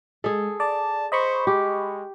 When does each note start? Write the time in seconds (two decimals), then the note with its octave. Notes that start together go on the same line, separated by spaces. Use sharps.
0.24 G#3 G#4 A4
0.60 D5 A5
1.12 C5 D#5 B5 C#6
1.47 G#3 G4